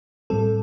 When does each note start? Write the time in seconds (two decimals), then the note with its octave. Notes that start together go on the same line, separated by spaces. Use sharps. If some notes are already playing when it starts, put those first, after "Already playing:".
0.30 A2 G3 C4 A4